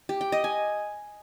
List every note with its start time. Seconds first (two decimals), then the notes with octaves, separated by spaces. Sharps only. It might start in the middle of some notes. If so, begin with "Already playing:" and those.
0.09 G4
0.21 G5
0.32 D#5
0.44 G#5